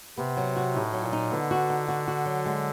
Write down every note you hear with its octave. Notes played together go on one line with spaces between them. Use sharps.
C3 B3
F#3
F#4
A2 D#4
F#3
A#2
D#4
D3 B3
F#4
D#4
F#4
F#4
F#3
G#3